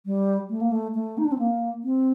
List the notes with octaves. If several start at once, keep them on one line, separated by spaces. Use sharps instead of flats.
G3
A3
A#3
A3
A3
D#4
D4
C4
A#3
C4